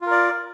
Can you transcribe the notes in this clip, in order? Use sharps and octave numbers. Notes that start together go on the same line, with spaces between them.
F4 A#4 D5